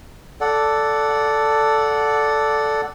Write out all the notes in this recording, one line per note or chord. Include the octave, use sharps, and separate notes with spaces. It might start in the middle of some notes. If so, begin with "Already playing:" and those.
A4 D5 F#5